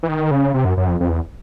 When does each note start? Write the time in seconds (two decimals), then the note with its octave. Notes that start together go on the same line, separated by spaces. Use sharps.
0.03 E3
0.08 D#3
0.31 C#3
0.54 C3
0.65 F#2
0.77 F#2
0.88 F2
1.00 F2
1.10 E2